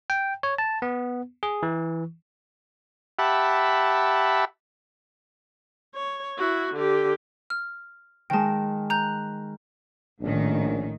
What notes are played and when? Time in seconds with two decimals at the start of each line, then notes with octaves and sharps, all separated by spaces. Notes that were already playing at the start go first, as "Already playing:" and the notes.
0.10 G5
0.43 C#5
0.58 A5
0.82 B3
1.43 G#4
1.63 E3
3.19 G4 E5 F#5 A5 B5
5.95 C#5
6.38 E4 F#4
6.75 D3 G4
7.50 F6
8.30 D#3 G#3 G5 A5
8.90 A#5 F#6 G6 F7
10.21 A#1 A2 D#3 C#4 D4